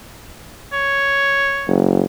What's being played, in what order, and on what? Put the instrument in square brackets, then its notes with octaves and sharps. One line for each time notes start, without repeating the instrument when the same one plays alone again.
[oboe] C#5
[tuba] F#1